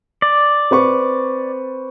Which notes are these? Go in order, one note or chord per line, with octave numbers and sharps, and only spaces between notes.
D5
C4 B4 C#6